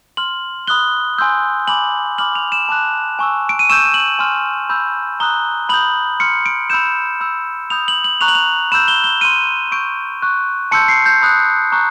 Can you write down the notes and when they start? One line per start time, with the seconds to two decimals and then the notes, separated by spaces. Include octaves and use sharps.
0.17 C6 F6 F#7
0.68 B5 D#6 F#6 G7
1.18 G#5 C6 E6 G6
1.68 G#5 B5 D6 F#7
2.18 B5 D6 F6 F#7
2.35 F7
2.52 E7
2.69 A5 D6 F#6
3.19 G#5 C#6 E6
3.49 D7
3.59 D#7
3.69 C#6 E6 G6 E7
3.94 F#7
4.19 G#5 C6 F6
4.69 B5 E6 G6
5.20 A#5 D#6 F#6 G7
5.69 B5 D#6 G6 F#7
6.20 C6 F6 C#7
6.46 D7
6.70 B5 E6 G6 E7
7.20 B5 E6 G6
7.70 B5 D#6 G6 F7
7.88 F#7
8.04 F#7
8.21 A#5 C#6 F#6 F7
8.28 F#7
8.35 F7
8.72 B5 E6 G6 E7
8.88 G7
9.04 G7
9.21 C6 F6 D#7
9.71 C#6 E6 G6 D7
10.22 C#6 F#6
10.71 A5 C6 E6 G6 C#7
10.88 C7
11.06 G6
11.22 B5 D#6 F#6
11.72 A#5 C#6 F#6